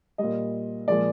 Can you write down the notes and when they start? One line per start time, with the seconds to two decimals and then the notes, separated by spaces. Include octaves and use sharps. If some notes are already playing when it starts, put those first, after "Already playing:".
0.18 A#2 G3 D#5
0.88 A#2 F3 G#3 D5